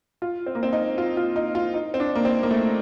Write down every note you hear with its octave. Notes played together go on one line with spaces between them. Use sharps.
F4
C4
A#3
C4
D#4
F4
F4
D#4
F4
D#4
C4
D4
A#3
C4
A#3
A3